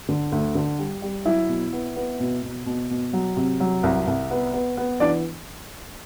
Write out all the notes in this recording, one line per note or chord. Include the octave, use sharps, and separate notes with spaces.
D3
D2
D3
G3
G3
F#3 E4 E5
B2
B3
B3
B2
B2
B2
B2
F#3
C3
F#3
C2
C2
B3
B3
B3
E3 D4 D5